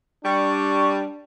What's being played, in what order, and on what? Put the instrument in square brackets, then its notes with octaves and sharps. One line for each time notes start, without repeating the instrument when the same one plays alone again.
[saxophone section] G3 [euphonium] D4 [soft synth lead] C#6